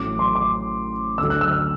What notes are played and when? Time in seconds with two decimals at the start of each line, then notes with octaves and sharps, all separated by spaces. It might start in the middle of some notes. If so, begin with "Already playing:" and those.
Already playing: A1 A2 F#3 D6
0.19 C6
0.35 D6
1.18 D2 D3 F#3 E6
1.30 F#6
1.41 E6
1.52 F6